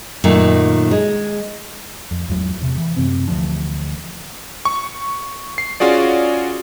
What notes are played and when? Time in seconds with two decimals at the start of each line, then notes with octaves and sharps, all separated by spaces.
0.24 F#2 A#2 D#3 A3
0.91 G#3
2.11 F2
2.28 G#1 E2 F#3
2.60 E1 C3
2.78 E3
2.96 F#2 C3 C4
3.28 D2 E3 F3 D4
4.65 C#6
5.58 C7
5.80 C#4 F4 F#4 G#4 D5